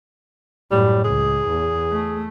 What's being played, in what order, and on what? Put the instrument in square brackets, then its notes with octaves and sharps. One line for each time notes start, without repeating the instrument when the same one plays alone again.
[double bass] F#2 A2 [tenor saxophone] G3
[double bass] C#2 [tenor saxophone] G#4
[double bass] E2
A3